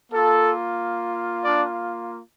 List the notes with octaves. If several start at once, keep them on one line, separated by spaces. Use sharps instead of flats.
A#3 F4 A4
D4 D5